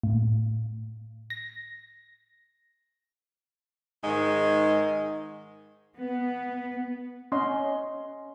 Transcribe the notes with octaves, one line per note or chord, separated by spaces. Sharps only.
A2
A#6
G#2 D#3 G#3
B3
C#4 D#5 C6